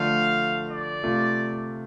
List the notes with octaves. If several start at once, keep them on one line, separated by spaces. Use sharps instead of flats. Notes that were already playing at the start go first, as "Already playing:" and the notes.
Already playing: D3 F3 A3 F5
D5
C3 A3 F4